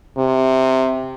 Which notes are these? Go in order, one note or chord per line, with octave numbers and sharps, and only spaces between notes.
C3